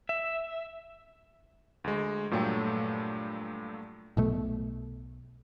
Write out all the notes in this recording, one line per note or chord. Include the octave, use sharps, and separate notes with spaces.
E5
D2 G#3
G2 A#2 F#3 A3 A4 G5
B1 B2 A3